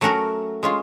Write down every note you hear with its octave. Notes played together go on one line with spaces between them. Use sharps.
F#3 A3 C#4 F#4 A#4
G#3 C#4 F4